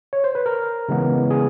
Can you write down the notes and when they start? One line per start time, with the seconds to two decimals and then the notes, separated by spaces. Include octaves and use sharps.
0.13 C#5
0.24 C5
0.35 B4
0.46 A#4
0.89 C#3 E3 G#3 B3
1.30 G#4